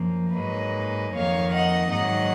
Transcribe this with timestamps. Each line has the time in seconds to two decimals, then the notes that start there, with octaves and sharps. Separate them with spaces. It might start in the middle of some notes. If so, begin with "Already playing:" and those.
Already playing: F#2 F3 A#3
0.35 G#2 F#3 A#3 B4 D#5
1.14 F2 D#3 A#3 C#5 F5
1.53 D#5 F#5
1.92 G#2 D#3 F#3 A#3 D#5 F#5